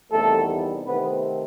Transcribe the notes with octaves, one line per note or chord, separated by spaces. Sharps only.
E2 C3 D#3 G3 A3 B3 A4
C3 D#3 A3 B3 C4 B4